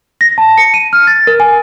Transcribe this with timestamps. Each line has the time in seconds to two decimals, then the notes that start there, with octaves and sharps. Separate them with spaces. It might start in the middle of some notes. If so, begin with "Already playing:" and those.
0.21 A#6
0.38 A5
0.58 C#7
0.74 D#7
0.93 F6
1.07 A6
1.27 A#4
1.40 G#5